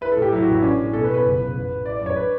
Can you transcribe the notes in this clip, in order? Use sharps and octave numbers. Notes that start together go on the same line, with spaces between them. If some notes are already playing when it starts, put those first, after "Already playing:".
E4 B4
A4
A2
G4
F#3 E4
F#4
A1
E4
C#4 D4
A2
B2 A4
B4
B2
B4
F#1
F#1
A1
A1
E4 D5
D5
F#2 C#5
D4 B4